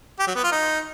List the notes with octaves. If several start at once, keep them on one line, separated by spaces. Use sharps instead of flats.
G4
F#3
B3
F4
D#4